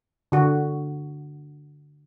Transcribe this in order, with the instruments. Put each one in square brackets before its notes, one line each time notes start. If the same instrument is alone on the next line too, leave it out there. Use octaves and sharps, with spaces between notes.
[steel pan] D3 F#4